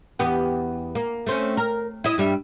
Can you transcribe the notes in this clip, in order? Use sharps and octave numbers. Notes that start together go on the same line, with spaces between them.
E2 B3 G4
A#3
A3 C4 C#4
A#4
E4 D#5
G2 G3 E5